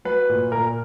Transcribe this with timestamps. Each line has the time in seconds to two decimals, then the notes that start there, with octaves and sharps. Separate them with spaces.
0.05 F#3 B4
0.29 A#2
0.52 A#2 A#4